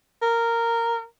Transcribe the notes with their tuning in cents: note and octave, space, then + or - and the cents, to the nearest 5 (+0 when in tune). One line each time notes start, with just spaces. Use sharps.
A#4 -10